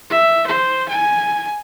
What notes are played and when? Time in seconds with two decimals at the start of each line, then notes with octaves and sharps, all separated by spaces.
0.10 E5
0.47 C5
0.89 G#5